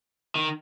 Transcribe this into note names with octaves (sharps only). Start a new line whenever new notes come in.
D#3